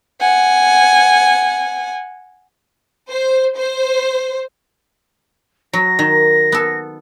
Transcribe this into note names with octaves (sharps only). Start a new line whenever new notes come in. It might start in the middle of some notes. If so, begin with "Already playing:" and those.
F#5 G#5
C5
C5
F#3 A#6
D#3
B3 A4